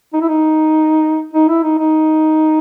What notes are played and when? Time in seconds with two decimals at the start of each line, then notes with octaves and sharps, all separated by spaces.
0.13 D#4
0.21 E4
0.29 D#4
1.33 D#4
1.48 E4
1.63 D#4
1.78 D#4